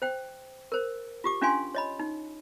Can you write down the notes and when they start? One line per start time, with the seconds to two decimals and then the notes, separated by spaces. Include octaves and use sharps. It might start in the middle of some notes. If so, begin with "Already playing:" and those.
0.02 C5 G5
0.72 A#4 C5
1.24 F4 G4 D6
1.42 C#4 D4 F4 F5 G#5 C6
1.75 C#5 D#5 B5
1.99 D#4